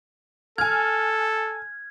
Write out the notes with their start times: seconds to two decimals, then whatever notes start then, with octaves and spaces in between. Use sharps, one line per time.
0.58 A4 G#5 F6 G#6